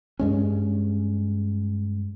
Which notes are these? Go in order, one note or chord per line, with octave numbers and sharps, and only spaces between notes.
G2 G#3 C#4